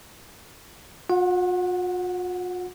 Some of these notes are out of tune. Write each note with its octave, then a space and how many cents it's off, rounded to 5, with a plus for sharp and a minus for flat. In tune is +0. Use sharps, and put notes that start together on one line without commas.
F4 +45 F#5 -10